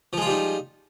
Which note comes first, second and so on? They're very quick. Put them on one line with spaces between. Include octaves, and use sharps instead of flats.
F3 G#3 F4 G3 D#4